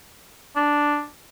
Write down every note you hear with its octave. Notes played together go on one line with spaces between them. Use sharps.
D4